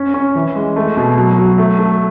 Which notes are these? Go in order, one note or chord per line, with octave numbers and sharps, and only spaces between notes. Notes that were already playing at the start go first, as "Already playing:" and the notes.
Already playing: C#4
C#4
E3
G#3
A3
B2
F#3
F#3
A3
A3